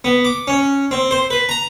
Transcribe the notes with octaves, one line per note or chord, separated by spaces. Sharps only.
B3
D6
C#4
C4
C5
B4
A#5